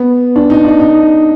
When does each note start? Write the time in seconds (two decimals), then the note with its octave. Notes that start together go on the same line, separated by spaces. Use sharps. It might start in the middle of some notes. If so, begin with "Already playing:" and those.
Already playing: B3
0.36 D4
0.50 D#4
0.65 D4
0.80 D#4